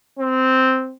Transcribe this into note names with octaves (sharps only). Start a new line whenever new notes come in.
C4